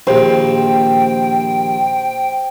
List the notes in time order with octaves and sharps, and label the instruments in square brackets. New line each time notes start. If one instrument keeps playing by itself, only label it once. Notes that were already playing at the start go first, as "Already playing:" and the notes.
[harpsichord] A#1 D#2 [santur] C5 [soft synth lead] G5